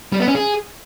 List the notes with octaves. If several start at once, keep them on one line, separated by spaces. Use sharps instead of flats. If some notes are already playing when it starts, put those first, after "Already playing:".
G3
B3
C#4
G#4